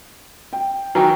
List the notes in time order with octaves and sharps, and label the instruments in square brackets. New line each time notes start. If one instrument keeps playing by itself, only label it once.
[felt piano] G5
[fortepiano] D#3 E3 F#3 [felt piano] G5 A#5